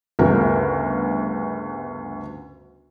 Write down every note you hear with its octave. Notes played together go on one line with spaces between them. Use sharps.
G1 D2 C#3 A#4